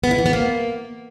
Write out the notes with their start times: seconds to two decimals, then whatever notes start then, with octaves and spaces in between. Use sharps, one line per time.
0.04 B3
0.11 E4
0.18 E3
0.26 B3
0.33 A#3